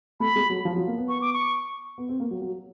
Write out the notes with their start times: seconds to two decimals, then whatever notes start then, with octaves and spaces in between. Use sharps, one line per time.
0.20 A3 B5
0.36 G#3
0.50 F#3
0.65 F3
0.76 F#3
0.87 A#3
0.98 B3
1.08 C#6
1.21 D6
1.33 C#6
1.98 B3
2.09 C4
2.20 A#3
2.31 F#3
2.42 F#3